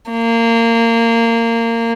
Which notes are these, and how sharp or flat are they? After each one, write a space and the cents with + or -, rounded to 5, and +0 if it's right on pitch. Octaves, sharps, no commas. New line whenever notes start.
A#3 -20